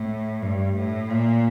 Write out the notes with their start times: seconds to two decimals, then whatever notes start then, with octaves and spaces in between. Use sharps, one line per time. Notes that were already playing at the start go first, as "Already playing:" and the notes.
Already playing: A2
0.42 G2
0.76 A2
1.10 A#2